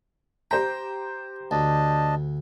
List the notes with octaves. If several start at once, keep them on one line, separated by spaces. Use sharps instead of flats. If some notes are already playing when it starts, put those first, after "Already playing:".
G4 C5 G5 A#5
D2 D4 D#5 A5